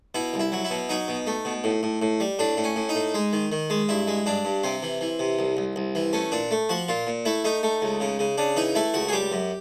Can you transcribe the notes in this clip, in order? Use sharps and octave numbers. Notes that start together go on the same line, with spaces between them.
B2 E4
C2
E4
F#3
E4
B2
F#3 D#4
B2
A3
B2
A2
A2
A2
G3
A2 D4
A2
C#4
A2
D#4
A2
G#3
D#3
D#3
G#3
G2 E4
G#3
G2 D4
G2
C3 C4
E3
E3
C3
C2
C2
C2
E3
A3 C#4
A#2 D4
A3
F3 F#4
A#2 F4
A#2
A3 E4
A3 D#4
A3
C#2
C#3
C#3
C#3 D4
E3 D#4
A3 E4
C#2 F#4
G#4
G3 G4
F#2